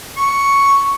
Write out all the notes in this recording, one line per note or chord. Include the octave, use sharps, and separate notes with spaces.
C#6